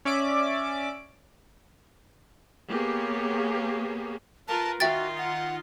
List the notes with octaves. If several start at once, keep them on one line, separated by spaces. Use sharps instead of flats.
C#4 D5 E5 D6
A#3 B3 G4 G#4 C#5
F4 A#4 B4 A5
D#3 D#4 F4 F#4 E5 G5 A6
F#5